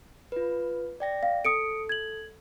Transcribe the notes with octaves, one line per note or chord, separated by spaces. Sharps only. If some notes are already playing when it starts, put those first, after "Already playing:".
F4 B4
D5 G5 A#6
F5
A4 D#6 C#7 D7
G#6 F#7